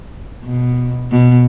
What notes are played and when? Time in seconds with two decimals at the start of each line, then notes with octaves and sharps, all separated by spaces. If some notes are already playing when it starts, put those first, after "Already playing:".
0.44 B2
1.11 B2